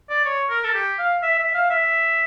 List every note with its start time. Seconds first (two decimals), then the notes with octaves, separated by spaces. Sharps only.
0.10 D5
0.25 C#5
0.50 A#4
0.64 A4
0.74 G4
0.99 F5
1.23 E5
1.39 E5
1.54 F5
1.70 E5